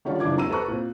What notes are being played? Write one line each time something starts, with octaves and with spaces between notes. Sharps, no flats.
D3 D#3 G3 C#4 D4 F4
F#1 E3 D4 F4 D6 G#6
G#1 D#2 A#5 E6 D#7
A4 B4 C5 A#5 C#6 F#6
A#2 C4